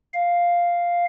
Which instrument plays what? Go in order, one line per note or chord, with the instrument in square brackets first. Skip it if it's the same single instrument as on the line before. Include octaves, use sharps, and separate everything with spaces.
[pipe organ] F5